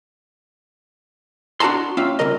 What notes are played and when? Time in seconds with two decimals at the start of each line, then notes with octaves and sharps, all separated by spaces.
1.60 D4 F#4 G4 A5 A#5 C6
1.97 A#3 C#4 F4 E5 F5 G5
2.19 C2 C#3 A#4 D#5